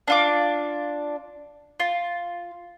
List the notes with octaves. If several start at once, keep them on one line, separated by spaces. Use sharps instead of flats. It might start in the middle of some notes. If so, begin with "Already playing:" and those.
D4 F4 D6
F4